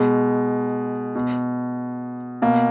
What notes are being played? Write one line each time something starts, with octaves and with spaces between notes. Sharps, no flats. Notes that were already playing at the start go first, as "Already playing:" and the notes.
Already playing: B2 G#3
B2
B2 A#3